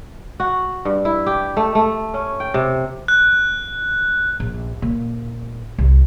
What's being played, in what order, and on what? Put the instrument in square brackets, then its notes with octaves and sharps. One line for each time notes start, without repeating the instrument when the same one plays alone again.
[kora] F#4
G2
E4
G4
A3
A3
C#4
G5
C3
[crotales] F#6
[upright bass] A#1
A#2
C2